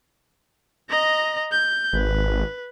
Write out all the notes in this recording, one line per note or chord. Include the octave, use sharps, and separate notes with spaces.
D#5 A#5
G6
G#1 B4